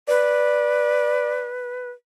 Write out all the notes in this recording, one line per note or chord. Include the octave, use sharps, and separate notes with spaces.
B4 D5